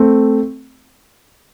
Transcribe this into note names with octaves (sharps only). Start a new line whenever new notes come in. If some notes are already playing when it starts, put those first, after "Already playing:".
Already playing: A3 C4